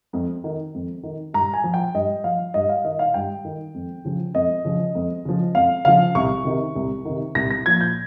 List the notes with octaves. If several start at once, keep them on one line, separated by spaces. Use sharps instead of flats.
F2
D#3
F2
D#3
G2 A#5
G#5
F3
G5
G2 D#5
F3 F5
G2 D#5
F5
D#3 D#5
F5
G2 G5
D#3
F2
C#3 F3
F2 D#5
C#3 F3
F2
C#3 F3
F2 F5
C#3 F3 F5
C2 C#6
C3 D#3
C2
C3 D#3
C2 A#6
A#6
A#2 F3 G#6
G6